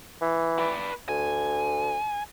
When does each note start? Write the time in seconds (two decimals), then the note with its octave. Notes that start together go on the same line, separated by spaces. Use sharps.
0.21 E3
0.59 B4 D5
1.09 D2 G#5